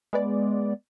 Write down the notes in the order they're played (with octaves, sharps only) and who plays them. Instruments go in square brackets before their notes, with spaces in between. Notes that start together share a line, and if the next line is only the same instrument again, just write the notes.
[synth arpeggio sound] G#3 B3 D5